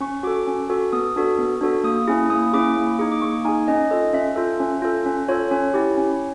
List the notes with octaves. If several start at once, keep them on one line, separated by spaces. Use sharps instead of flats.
C#4 C#6
F#4 A4 D6
C#4
F#4 A4
B3 D#6
D4 F#4 A4
B3
D4 F#4 A4
A#3 D#6
C#4 E4 G#4
A#3 D#6
C#4 E4 G#4 D6
A#3
D#4 G#4
D6
A#3 C#6
D#4 G#4 G#5
C#4 D#5
F4 A4 D#5
C#4 E5
F4 A4
C#4
F4 A4
C#4
F4 A4 C#5
C#4 C#5
E4 G4
C#4